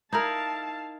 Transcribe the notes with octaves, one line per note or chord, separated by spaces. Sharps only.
D#4 E4 A#4 F5 A5